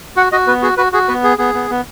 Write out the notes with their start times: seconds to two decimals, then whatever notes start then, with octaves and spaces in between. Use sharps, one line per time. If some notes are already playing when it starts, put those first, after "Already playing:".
0.16 F#4 F#5
0.32 F#4 D#5
0.47 B3 B4
0.62 F#4 G#4
0.77 F#4 B4
0.93 F#4 G#4
1.08 B3 B4
1.24 G#4
1.39 B3 G#4
1.54 B3
1.70 B3